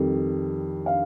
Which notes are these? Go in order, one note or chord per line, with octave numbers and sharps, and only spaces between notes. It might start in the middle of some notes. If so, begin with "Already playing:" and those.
Already playing: F2 D#3 G3
F5